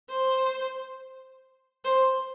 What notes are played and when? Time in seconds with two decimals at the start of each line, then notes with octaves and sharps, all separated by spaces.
0.11 C5
1.85 C5